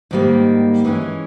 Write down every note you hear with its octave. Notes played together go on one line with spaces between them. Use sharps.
G#2 D#3 G3 A#3
E3 G#3 C#4